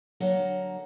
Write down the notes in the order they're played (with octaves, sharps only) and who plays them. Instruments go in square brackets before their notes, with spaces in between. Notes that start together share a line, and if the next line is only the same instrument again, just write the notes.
[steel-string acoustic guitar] D3 F#3 A#3 D#5 F#5